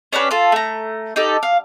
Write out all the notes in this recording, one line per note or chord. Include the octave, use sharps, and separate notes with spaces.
C#4 D4 G4 B4
F4 A4
A3 A#5
D#4 G4 A4
F5